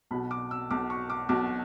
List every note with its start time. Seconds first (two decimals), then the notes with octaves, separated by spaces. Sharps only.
0.11 B1 B5
0.13 B2
0.31 D6
0.51 E6
0.71 B1 B2 D6
0.90 C#6
1.10 D6
1.29 B1 B2 D6